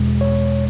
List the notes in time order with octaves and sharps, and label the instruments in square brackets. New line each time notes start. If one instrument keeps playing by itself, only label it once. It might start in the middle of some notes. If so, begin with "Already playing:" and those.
Already playing: [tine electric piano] E2 B2 G#3
C#5